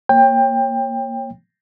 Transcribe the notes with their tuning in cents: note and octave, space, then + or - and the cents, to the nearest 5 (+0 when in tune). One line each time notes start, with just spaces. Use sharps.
A#3 +0 C#5 -25 G5 +20